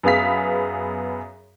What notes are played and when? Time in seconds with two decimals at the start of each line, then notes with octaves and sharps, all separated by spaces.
0.03 F#2 B3 G#4 F5 B6